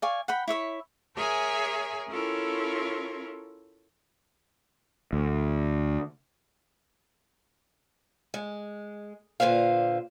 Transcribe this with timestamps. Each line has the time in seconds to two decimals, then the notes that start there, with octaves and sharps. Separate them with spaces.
0.02 D5 F5 G#5 C#6
0.28 F#5 G5 B5
0.48 E4 C#5 E5 C#6
1.16 G#4 A#4 C#5 E5 G#5
2.09 C#4 E4 F4 A4 A#4 C#5
5.13 D2
8.34 G#3
9.40 A#2 D3 B4 C5 F5